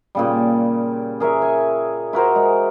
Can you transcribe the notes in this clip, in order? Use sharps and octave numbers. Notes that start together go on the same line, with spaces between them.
A#2 C#3 G3
G#4 A#4 C#5 E5
G#5
E4 F#4 A#4 C5
G#3